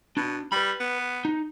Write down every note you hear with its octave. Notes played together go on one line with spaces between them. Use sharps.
B2 D4
G3 B4 B5
B3
D#4